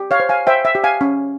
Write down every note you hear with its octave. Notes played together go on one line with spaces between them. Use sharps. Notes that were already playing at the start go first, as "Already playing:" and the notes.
Already playing: G4
C#5 F5
C5
F5 G#5
C5 E5 G5
E5
G4
F5 G#5
C#4